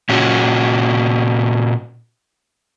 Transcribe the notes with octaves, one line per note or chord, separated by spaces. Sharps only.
A#2 C#4 F#4